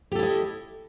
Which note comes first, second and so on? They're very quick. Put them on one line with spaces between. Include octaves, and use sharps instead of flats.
G4 A4 E4 D#5